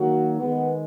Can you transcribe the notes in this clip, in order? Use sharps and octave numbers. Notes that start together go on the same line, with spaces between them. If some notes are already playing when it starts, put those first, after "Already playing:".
Already playing: D#3 F#3 A#3 F#4
D#3 G#3 B3